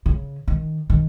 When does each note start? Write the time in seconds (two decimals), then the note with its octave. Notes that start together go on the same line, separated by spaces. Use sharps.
0.06 C#3
0.48 D#3
0.90 D#3